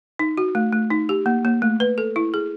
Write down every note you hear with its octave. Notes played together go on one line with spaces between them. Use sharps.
D#4
F#4
A3
A3
D#4
G4
A#3
A#3
A3
B4
A4
E4
G#4